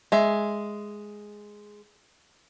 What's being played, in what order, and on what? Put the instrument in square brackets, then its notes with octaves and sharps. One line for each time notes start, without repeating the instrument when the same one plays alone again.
[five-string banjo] G#3 E5